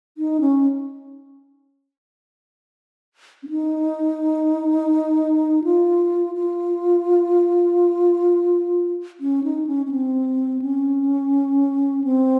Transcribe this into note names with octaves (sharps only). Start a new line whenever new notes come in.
D#4
C#4
C#4
D#4
F4
F4
C#4
D#4
C#4
C#4
C4
C#4
C4